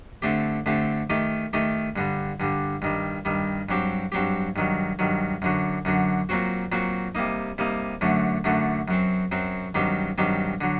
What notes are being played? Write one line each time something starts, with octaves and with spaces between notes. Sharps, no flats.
D3 A3 C4 G4
D3 A3 C4 G4
D#3 A3 D#4 G4
D#3 A3 D#4 G4
G2 D3 G3
G2 D3 G3
G2 D#3 G3
G2 D#3 G3
G2 F#3 C4 G4
G2 F#3 C4 G4
G2 D#3 F#3
G2 D#3 F#3
F#2 D3 F#3
F#2 D3 F#3
A#2 F#3 C4 F#4
A#2 F#3 C4 F#4
C3 G3 A#3 D#4
C3 G3 A#3 D#4
F#2 D3 F#3 A3
F#2 D3 F#3 A3
F#2 F#3 C4
F#2 F#3 C4
G2 D#3 F#3 C4 G4
G2 D#3 F#3 C4 G4
D3 F#3